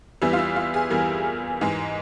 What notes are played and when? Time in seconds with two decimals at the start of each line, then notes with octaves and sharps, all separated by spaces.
0.22 E2 E3 G3 E4
0.33 F4
0.39 E4
0.56 F4
0.74 G#4
0.90 E2 E3 G3 A#4
1.61 G#2 E3 G#3